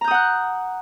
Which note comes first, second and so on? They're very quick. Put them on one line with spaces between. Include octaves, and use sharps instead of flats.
A#5 G6 D#6 F#5 F#6